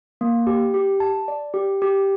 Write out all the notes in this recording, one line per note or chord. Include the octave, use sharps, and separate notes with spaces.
A#3
G4
G4
A5
D5
G4
G4